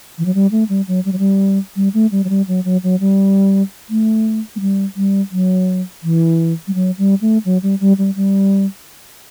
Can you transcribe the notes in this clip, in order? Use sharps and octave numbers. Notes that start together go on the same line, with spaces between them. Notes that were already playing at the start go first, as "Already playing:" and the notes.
E3
F#3
G3
A3
G3
F#3
G3
F#3
G3
G3
A3
G3
F#3
G3
F#3
F#3
F#3
G3
A3
A3
G3
G3
F#3
E3
G3
F#3
G3
A3
F#3
G3
G3
G3
G3